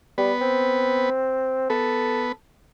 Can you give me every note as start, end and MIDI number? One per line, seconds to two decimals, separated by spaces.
0.18 0.32 55
0.18 1.10 59
0.18 1.10 71
0.41 1.68 60
1.70 2.32 59
1.70 2.31 69
1.70 2.32 71